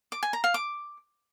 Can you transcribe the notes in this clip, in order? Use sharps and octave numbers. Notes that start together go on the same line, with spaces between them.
D6
G#5
A#5
F5
D6